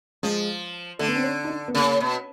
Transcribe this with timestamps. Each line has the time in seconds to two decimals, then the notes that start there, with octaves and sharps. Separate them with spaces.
0.23 F3 G#3
0.99 D3 A3
1.08 B3
1.16 C4
1.24 C#4
1.44 D#4
1.50 D4
1.68 B3
1.74 C#3 A#3
2.00 B2